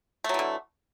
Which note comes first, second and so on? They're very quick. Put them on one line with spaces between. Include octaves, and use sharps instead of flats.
A3 F#3 E3 D3